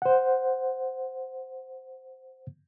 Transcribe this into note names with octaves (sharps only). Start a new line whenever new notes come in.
C5 F#5